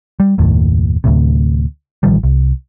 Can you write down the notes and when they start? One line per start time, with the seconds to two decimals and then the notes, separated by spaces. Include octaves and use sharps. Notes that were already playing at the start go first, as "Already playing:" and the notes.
0.20 G3
0.38 F#1 D#2 A2
1.04 D2 A2 C3
2.03 A1 D#3 F3 G3
2.23 C2